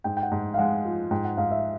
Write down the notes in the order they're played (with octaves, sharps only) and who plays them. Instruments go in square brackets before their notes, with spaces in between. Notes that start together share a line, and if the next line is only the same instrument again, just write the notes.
[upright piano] G#2 [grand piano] G5
[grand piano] G5
F#5
[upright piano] G#2
[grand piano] F5
[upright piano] G#3 [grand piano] F#5
[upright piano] F3
[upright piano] G#2 [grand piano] G5
[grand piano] F#5
[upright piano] G#2 [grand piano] F5
[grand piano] E5